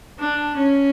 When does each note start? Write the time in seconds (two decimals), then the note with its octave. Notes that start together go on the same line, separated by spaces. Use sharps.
0.19 D4
0.57 C#4